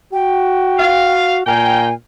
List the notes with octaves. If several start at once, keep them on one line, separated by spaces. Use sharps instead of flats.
F#4 G5
F5
A#2 A#4 F5 G5 G#5